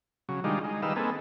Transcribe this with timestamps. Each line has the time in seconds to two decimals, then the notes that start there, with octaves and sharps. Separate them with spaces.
0.29 C#3 F#3
0.44 D#3 G3 G#3 D4 D#4 F4
0.64 G#3 D#4
0.82 D#3 G3 D#4 B4 F5 E6
0.96 A#3 C4 D#4 G#4 A4 B4